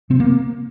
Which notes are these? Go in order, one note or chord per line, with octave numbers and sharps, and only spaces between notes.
C3 C4
A#3